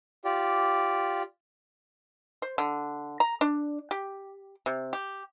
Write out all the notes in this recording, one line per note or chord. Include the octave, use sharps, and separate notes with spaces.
F4 G4 D5
C5
D3
A#5
D4
G4
C3
G4